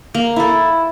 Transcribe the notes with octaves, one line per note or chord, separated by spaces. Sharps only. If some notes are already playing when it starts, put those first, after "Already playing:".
A#3
E4 A4